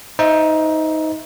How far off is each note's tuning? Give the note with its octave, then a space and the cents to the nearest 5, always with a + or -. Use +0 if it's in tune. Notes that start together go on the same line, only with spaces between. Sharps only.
D#4 +15 C5 -10 E5 +0